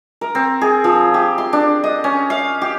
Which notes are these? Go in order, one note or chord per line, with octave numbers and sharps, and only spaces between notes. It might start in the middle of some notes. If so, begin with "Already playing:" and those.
A#4
C4
G#4
F3
G4
C6
D4
D#5
C#4
F5
G4